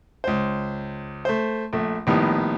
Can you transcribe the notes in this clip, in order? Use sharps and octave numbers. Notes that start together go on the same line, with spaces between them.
C#2 C5
A3 C5
A#1 A3
A#1 A2 D#3 G3 B3